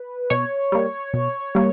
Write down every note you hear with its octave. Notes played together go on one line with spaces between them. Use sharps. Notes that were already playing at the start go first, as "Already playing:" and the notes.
Already playing: B4
B2 C#5
G3 A#3
B2
G3 A#3